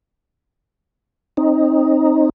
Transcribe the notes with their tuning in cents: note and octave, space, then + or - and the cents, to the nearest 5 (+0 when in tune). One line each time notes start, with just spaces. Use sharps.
C4 +30 D#4 +0